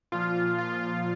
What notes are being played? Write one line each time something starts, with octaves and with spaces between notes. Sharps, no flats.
A#2 F3 F4
F4